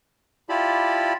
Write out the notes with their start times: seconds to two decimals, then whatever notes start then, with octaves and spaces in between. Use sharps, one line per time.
0.49 E4 F4 G4 D5 A5 B5